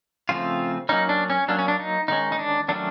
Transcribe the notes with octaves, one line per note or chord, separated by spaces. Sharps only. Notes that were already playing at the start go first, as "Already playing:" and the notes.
C#3 F3 A3 C4 F4
F#3 A#3 C#4 D#4
D4
C#4
F#3 A#3 C#4 D4
C#4
D4
D#4
D#3 G#3 C#4 D#4
D#4
D4
D#3 F#3 A3 C#4 D4